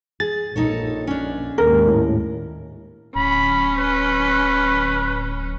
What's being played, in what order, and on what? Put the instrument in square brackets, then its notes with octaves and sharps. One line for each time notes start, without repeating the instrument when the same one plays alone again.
[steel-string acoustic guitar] G#4 [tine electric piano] A6
[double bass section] A#1 [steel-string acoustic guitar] D#4 A4 C#5
[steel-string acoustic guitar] C#4 D4
[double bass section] D#2 G#2 [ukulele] A#4
[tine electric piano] A2
[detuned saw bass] D1 [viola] C#4 [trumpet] B5
[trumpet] B4